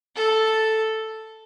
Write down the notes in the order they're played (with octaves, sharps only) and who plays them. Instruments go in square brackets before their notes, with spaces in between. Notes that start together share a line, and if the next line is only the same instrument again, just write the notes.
[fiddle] A4